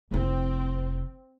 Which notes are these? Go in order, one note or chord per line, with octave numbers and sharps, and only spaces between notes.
F1 C4 E4